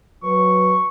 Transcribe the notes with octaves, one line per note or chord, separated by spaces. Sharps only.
F#3 B4 C#6